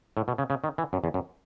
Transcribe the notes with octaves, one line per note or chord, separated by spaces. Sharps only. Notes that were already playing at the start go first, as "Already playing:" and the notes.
A2
B2
C#3
C#3
D#3
E3
F#2
E2
F#2